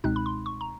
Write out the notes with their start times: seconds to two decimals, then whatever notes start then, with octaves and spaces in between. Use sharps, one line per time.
0.04 C#2 B2 G#3 C4 D#4 F#6
0.16 B5
0.26 C6
0.46 C#6
0.61 A#5